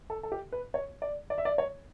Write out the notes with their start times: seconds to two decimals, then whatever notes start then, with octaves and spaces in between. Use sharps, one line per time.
0.10 A4
0.23 A4
0.32 G4
0.52 B4
0.74 C#5
1.02 D5
1.30 D5
1.38 E5
1.45 D5
1.58 C#5